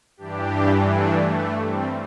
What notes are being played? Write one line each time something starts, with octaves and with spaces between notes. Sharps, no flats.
G2 E3 D4 G4
A3 D4
A3
G3 C4